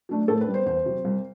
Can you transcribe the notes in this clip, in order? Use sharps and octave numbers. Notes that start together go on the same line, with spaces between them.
F#3 A3 D4
A2 A4
B4
G3
B3 C5
E2 C5
C3 F#3
C2